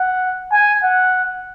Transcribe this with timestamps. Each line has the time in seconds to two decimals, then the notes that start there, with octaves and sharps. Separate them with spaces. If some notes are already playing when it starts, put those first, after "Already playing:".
Already playing: F#5
0.52 G#5
0.83 F#5